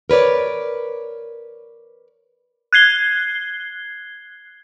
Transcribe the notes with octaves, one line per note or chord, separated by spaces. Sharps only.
A#4 B4 C#5 D5
F#6 G#6 C7 G7